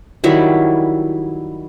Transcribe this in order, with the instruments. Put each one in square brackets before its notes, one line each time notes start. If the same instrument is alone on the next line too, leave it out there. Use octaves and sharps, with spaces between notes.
[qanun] D#3 F#3 G3 E4